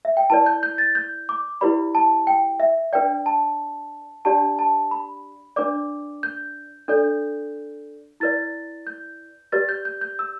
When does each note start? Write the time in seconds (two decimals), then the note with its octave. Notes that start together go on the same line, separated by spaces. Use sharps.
0.05 E5
0.17 G5
0.30 E4 B4 D5 A5
0.46 G6
0.63 G6
0.78 A6
0.95 G6
1.29 D6
1.61 E4 G4 B4 D5 B5
1.95 A5
2.27 G5
2.60 E5
2.93 D4 B4 D5 G5
3.26 A5
4.25 D4 G4 D5 A5
4.59 A5
4.91 B5
5.56 D4 B4 D5 D6
6.23 G6
6.88 D4 A4 D5 G6
8.20 E4 B4 D5 A6
8.87 G6
9.52 G4 B4 D5 A6
9.69 G6
9.85 G6
10.01 G6
10.19 E6